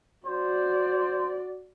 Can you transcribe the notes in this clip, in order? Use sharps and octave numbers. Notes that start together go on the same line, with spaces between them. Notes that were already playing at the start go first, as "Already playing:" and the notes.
F#4 C5 D5